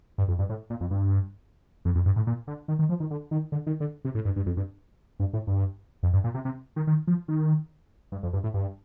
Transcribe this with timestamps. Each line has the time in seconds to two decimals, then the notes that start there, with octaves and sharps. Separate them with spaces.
0.18 G2
0.28 F2
0.39 G2
0.49 A2
0.70 A#2
0.81 F2
0.91 G2
1.85 F2
1.95 F2
2.06 G2
2.16 A2
2.27 A#2
2.47 D3
2.68 D#3
2.79 D#3
2.89 F3
3.00 D#3
3.11 D3
3.31 D#3
3.52 D3
3.67 D#3
3.80 D3
4.05 C3
4.15 A2
4.25 G2
4.36 G2
4.46 F2
4.57 G2
5.20 G2
5.33 A2
5.47 G2
6.03 F2
6.13 G2
6.24 A#2
6.34 C3
6.45 C3
6.76 D#3
6.87 D#3
7.07 F3
7.28 D#3
8.12 G2
8.23 F2
8.33 G2
8.44 A2
8.54 G2